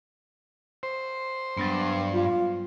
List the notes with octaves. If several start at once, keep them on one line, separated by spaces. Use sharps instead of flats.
C5
G2 F#3 G3 B3
F4